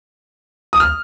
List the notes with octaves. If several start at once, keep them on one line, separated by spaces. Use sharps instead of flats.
D#6
F6